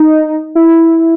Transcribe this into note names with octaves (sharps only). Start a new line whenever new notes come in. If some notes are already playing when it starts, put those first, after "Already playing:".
Already playing: D#4
E4